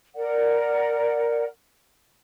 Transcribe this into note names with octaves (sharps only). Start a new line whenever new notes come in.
A#4 D5 F#5